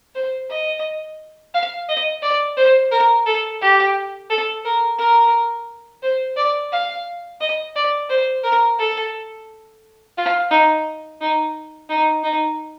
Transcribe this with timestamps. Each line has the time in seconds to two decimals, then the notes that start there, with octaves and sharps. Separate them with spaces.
0.15 C5
0.50 D#5
1.54 F5
1.89 D#5
2.22 D5
2.57 C5
2.91 A#4
3.26 A4
3.61 G4
4.30 A4
4.65 A#4
4.98 A#4
6.02 C5
6.37 D5
6.72 F5
7.41 D#5
7.76 D5
8.09 C5
8.44 A#4
8.79 A4
10.17 F4
10.51 D#4
11.21 D#4
11.89 D#4
12.24 D#4